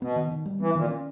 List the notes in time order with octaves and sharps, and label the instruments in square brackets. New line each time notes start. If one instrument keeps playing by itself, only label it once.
[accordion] B2 [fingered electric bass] B3
[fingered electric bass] D#3
D#3
G3
[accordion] E3 [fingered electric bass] B3
[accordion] A#2 [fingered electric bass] D#3
[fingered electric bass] C#4